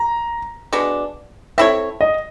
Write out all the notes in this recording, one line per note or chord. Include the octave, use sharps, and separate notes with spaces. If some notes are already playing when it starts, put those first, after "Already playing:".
Already playing: A#5
B2 G#3 B3 D4
C4 E4 A4 C#5 E5
D#5